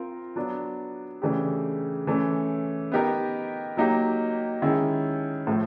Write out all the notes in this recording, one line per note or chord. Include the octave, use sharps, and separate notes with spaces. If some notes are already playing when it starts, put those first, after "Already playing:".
Already playing: C4 F4 A#4
F#3 B3 D4
C#3 E3 A3 D4 G4
E3 A3 C#4
B3 D#4 G4 A#4
F#3 A#3 D#4 G4
D#3 G#3 C#4 E4
A2 F3 A3